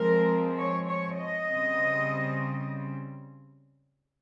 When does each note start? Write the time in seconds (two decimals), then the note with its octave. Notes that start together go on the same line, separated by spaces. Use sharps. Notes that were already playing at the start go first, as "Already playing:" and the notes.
Already playing: F3 G#3 C4 A#4
0.58 C#5
0.89 C#5
1.18 D#5
1.48 C#3 G3 C4